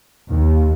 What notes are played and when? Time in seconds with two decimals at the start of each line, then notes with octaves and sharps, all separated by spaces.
0.29 D#2